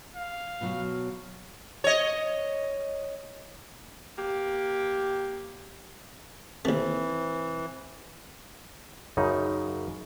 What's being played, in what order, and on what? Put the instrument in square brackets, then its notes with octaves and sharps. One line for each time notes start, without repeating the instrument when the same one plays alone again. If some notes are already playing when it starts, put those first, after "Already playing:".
[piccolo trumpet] F5
[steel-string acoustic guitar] B2 F#3 F#4
[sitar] C#5 D#5
[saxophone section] A#3 G4
[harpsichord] D#2 A3 [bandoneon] E3 [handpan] C4
[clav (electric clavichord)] F#2 C#3 D#4